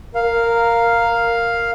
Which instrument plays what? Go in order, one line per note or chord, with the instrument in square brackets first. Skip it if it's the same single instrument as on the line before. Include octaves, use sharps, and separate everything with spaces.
[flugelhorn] A#4 [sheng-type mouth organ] F5